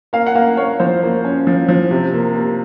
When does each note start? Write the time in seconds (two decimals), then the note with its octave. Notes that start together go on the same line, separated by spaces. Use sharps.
0.13 A#3 F5
0.26 F#5
0.35 A#3 F5
0.57 A#3 C#5
0.79 F3 C5
1.03 A#3
1.24 C#4
1.47 F3
1.69 F3
1.91 C3
2.13 A#3
2.36 A#3